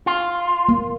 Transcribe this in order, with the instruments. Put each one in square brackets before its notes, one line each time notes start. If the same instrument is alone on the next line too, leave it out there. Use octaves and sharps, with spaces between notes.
[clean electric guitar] F4
[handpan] A#3